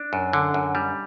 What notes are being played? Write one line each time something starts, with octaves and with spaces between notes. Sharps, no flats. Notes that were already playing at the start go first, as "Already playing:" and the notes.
Already playing: D4
F#2
D3
F#2
G3